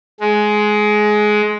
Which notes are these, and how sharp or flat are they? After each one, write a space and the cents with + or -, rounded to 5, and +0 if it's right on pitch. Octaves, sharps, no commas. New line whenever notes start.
G#3 +15